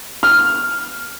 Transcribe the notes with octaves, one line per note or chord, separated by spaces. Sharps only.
F6